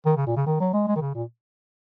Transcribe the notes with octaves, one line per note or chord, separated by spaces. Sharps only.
D#3
C#3
A#2
C#3
D#3
F#3
G#3
G#3
D#3
C#3
A#2